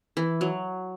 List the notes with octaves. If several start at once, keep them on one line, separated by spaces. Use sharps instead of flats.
E3
F#3